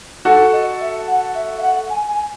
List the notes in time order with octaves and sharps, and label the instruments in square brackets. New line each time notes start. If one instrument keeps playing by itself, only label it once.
[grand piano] F#4 A4 [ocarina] F#5
[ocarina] D#5
E5
F#5
E5
E5
F#5
G#5
G#5